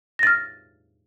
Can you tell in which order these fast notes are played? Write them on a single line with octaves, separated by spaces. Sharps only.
A#6 A6 F6